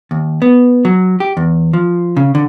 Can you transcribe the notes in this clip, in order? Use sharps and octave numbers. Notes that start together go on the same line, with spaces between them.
D#2
B3
F#3
G4
E2
F3
C#3
D3